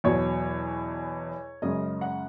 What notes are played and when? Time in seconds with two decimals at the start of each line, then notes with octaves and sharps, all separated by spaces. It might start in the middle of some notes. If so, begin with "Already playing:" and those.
0.04 E2 B2 F#3 C#5
1.62 F#2 C#3 G#3 D#5
2.01 F#5